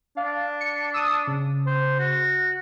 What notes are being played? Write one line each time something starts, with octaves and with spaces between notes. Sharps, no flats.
D4 F5
C#7
D#6 E6
C#3
C5
F#4